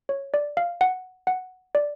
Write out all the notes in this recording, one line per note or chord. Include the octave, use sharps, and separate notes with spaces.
C#5
D5
F5
F#5
F#5
D5